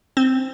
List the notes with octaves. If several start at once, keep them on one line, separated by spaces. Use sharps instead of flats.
C4